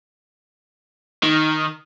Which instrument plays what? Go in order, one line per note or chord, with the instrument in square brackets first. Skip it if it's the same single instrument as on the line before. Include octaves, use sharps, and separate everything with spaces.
[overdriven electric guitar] D#3